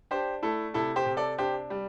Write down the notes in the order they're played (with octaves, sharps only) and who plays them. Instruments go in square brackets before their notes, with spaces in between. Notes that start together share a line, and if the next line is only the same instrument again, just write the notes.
[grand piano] D4 G4 C5
A3 E4 A4
C3 E4 A4
G4 C5
C3
A4 D5
D4 G4 C5
G3